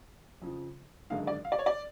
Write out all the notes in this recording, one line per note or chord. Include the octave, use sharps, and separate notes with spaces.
F2 C#3 F3
G#1 F#2 D3 G#3 F5
D5
F5
D5
C#5
D5